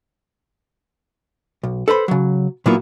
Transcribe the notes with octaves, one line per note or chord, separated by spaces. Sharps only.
B1
A4 B4 C5 B5
C#3 F#3
A#2 F#3 A#3 B3 E4 F4